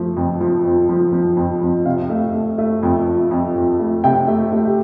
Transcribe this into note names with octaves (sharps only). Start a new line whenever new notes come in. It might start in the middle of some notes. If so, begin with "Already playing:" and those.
Already playing: F3 A3
F2
F3
F2
F3
F3
F2
F2
C3 F5
A3
A3
A3
F2
F2
F2
F2
A3
C3 G5
A3
A3
G4